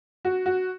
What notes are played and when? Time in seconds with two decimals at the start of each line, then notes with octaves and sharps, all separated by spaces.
0.25 F#4
0.46 F#4